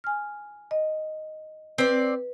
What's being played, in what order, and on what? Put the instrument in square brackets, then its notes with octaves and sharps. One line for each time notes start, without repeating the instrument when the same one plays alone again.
[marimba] G#5 F6
D#5
[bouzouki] C4 D5 [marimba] B4